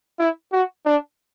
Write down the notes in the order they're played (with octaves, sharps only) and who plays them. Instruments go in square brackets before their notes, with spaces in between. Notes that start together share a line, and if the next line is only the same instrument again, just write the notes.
[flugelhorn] E4
F#4
D4